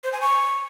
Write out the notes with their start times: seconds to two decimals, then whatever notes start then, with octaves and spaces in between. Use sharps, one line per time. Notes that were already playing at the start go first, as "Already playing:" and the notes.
0.04 C5
0.13 G#5
0.21 C#6